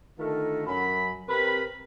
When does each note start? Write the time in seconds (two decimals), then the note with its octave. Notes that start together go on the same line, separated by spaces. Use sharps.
0.18 D3 D#3 A3 F4 A4 A#4
0.66 F#2 F#3 B5
1.28 C3 C4 A#4 B4 B5